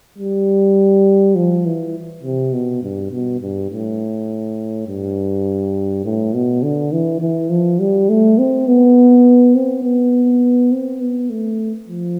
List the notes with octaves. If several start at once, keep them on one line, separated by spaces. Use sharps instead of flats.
G3
F3
E3
C3
B2
G2
B2
G2
A2
G2
A2
B2
D3
E3
E3
F3
G3
A3
C4
B3
C4
B3
C4
B3
A3
F3